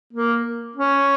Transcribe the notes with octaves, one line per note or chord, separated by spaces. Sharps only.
A#3
C#4